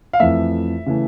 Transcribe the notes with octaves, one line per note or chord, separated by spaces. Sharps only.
F5
F2 E3 A3 E5
C#3 E3 A3